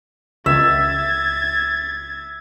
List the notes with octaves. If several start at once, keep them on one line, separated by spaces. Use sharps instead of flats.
C#2 E5 G#6 A6